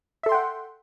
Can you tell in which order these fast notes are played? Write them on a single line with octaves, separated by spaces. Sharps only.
E5 A4 C6 G5 F#5